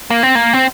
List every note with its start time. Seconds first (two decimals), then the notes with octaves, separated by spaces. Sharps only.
0.10 A#3
0.23 C4
0.35 A#3
0.53 C4